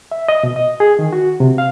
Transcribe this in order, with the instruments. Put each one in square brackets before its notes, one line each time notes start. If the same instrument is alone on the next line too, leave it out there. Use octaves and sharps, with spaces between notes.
[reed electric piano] E5
D#5
B2
D#5
G#4
D#3
F#4
C3
F5